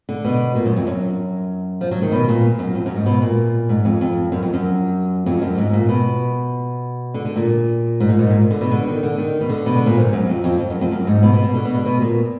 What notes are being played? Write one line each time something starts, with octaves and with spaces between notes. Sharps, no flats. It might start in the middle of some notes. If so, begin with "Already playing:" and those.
D3
B2
A#2
F#2
F2
F#2
F3
F#3
D#3
B2
A#2
F#2
F2
F#2
G#2
B2
A#2
G#2
F2
F2
F#2
F2
F#2
F2
F#2
G#2
A#2
B2
D3
D3
A#2
G#2
A#2
G#2
A#2
D3
B2
D3
D#3
D3
D#3
B2
D3
B2
D3
A#2
G#2
F#2
F2
F2
F2
F#2
F2
F#2
G#2
B2
B2
B2
D3
B2
D3
B2
A#2